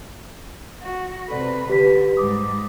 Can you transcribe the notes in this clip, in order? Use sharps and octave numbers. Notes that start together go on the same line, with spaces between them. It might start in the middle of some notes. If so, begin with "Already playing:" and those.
F#4
C3 A4 B4 D5
D3 G4 B4 B6
G#2 G3 D6 D#6